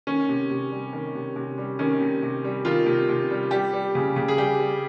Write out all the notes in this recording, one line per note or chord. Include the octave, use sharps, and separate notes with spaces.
D#3 C#4
C3
C3
G3
D#3
C3
C3
G3
D#3 C#4
C3
C3
G3
D#3 F4
C3
C3
G3
G3 G4
G3
C#3
C#3
G#4
G3 G4
G3